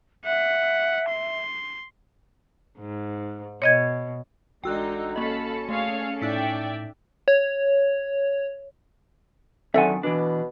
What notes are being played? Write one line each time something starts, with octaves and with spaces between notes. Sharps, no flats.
E5 F#5 B6
C6
G#2
B2 C#5 D#5 G#6
A1 D3 G#3 D#4 F#4 G5 E6 F#6
A#3 C#4 A4 D#5 F5 A5 B5 C#7
A3 G#4 C#5 F5
A2 D#4 D5 E5 G5 E6 B6
C#5
F#2 D3 D#3 C4 A4 E5 F#5 G#5
B2 E3 D4